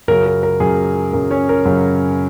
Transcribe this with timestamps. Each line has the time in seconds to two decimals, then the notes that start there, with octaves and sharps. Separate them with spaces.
0.08 F#2 C#3 F#3 A#4
0.26 A#4
0.43 A#4
0.60 F#2 C#3 F#3 G#4
1.13 F#2 C#3 F#3 A#4
1.31 C#4 C#5
1.49 A#4
1.65 F#2 C#3 F#3